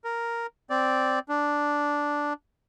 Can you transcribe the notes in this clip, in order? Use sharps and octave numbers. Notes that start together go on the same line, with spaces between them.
A#4
C4 D5
D4